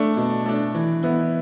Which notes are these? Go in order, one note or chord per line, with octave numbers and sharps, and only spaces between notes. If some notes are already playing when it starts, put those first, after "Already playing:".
Already playing: A3 D4
B2
A3 D4
E3
B3 E4